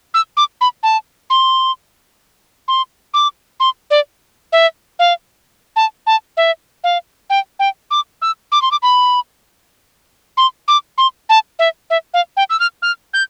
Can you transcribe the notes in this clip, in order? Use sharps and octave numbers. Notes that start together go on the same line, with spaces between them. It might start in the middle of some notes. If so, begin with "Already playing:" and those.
E6
D6
B5
A5
C6
C6
D6
C6
D5
E5
F5
A5
A5
E5
F5
G5
G5
D6
E6
D6
C6
D6
B5
C6
D6
C6
A5
E5
E5
F5
G5
E6
F6
F6
G6